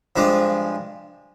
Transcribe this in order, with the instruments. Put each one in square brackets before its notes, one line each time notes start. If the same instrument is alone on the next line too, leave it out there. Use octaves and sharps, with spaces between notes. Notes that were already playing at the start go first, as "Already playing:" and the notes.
[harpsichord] G2 F3 G#3 D4